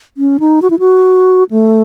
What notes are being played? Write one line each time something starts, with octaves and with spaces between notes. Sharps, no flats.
C#4
D#4
F#4
E4
F#4
A3